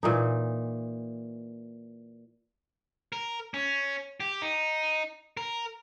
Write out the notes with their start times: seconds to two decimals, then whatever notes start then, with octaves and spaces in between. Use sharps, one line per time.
0.03 A#2 E3 D#4
3.13 A#4
3.54 C#4
4.20 G4
4.42 D#4
5.37 A#4